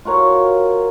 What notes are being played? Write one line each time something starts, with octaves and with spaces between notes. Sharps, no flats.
F4 F#4 A#4 C#5